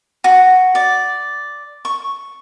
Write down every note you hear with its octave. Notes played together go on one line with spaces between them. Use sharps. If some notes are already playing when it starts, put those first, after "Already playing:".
F#4
D5
C#6